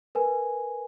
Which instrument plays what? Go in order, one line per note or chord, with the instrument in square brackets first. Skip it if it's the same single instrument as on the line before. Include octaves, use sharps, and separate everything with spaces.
[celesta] A#4 B4 G#5